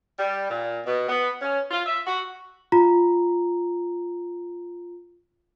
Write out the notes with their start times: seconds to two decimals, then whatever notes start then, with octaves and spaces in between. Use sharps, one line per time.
0.17 G3
0.49 A#2
0.84 B2
1.08 B3
1.40 C#4
1.71 F4
1.86 E5
2.06 F#4
2.72 F4 A#5